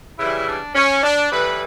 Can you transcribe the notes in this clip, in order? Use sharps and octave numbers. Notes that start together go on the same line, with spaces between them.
C#3 E3 G3 E4
D4
C#4
D4
A2 E3 G3 B4